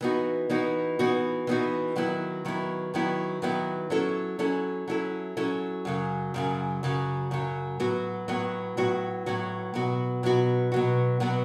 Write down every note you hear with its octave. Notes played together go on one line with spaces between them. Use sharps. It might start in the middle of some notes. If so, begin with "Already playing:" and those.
E3 B3 D#4 F#4
E3 B3 D#4 F#4
E3 B3 D#4 F#4
E3 B3 D#4 F#4
D#3 F#3 B3 E4
D#3 F#3 B3 E4
D#3 F#3 B3 E4
D#3 F#3 B3 E4
F#3 C#4 E4 A4
F#3 C#4 E4 A4
F#3 C#4 E4 A4
F#3 C#4 E4 A4
F#2 C#3 F#3
F#2 C#3 F#3
F#2 C#3 F#3
F#2 C#3 F#3
A2 F#3 B3 F#4
A2 F#3 B3 F#4
A2 F#3 B3 F#4
A2 F#3 B3 F#4
B2 F#3 B3 F#4
B2 F#3 B3 F#4
B2 F#3 B3 F#4
B2 F#3 B3 F#4